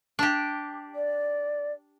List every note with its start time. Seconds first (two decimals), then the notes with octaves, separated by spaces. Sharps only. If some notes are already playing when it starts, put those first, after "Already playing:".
0.19 D4 G4
0.95 D5